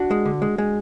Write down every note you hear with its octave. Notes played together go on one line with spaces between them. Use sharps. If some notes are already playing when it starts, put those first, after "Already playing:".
Already playing: D4 F#4
G#3
D3
G#3
G#3